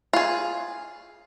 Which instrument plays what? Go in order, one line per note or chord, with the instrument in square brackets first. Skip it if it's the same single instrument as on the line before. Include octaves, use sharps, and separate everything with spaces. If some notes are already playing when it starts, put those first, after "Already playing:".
[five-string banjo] F4 G#4